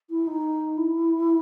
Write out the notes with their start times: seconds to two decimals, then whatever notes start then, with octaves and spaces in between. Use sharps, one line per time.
0.10 E4
0.27 D#4
0.77 E4